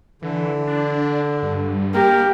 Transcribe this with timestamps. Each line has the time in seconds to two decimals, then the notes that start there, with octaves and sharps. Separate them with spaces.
0.22 D3 E3
0.67 D4
1.43 G2
1.94 A#3 G4 A#4